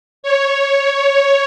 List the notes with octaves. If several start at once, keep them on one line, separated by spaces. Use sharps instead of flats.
C#5